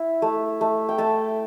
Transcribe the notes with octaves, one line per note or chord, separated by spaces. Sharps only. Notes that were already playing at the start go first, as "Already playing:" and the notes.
Already playing: E4
A3
A3
G5
A3 A5